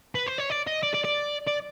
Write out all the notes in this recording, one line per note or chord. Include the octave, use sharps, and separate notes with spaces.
B4
C5
C#5
D5
D#5
D5
D5
D5
D5